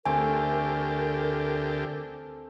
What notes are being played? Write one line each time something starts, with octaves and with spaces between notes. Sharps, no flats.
D2 D3 A3 C4 G4 A#4 G#5